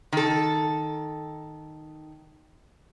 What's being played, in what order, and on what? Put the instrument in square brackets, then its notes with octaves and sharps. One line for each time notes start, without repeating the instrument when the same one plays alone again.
[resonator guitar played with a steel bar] D#3 A4